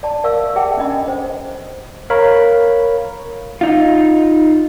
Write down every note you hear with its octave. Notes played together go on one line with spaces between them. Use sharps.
D5 A5
A#4 D5 E5 F5 C#6 E6
G#4 D5 E5 F#5 G5 A5
C#4 D4 D#5 B5
A4
C5 D#5
A#4 C#5 F5 B5
D#4 F4